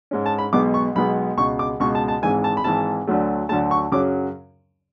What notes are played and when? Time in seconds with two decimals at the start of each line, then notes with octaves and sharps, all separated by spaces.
0.11 G#2 G#3 C#4
0.26 A5
0.39 B5
0.53 B1 B2 G#3 B3 D6
0.74 C#6
0.95 B1 B2 G#3 B3 B5
1.37 C#2 B2 G#3 C#6
1.59 D6
1.80 C#2 B2 G#3 C#6
1.95 A5
2.08 A5
2.22 G#1 G#2 E3 G#3 G#5
2.44 A5
2.57 B5
2.64 G#1 G#2 E3 G#3 A5
3.07 D2 D3 F#3 A3
3.49 D2 D3 F#3 A3 A5
3.71 C#6
3.92 F#2 C#3 F#3 C#4 D6